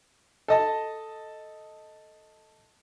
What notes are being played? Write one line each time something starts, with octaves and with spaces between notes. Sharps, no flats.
A4 D#5 A5